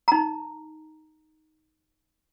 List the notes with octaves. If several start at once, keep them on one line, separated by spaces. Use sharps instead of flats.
D#4 A#5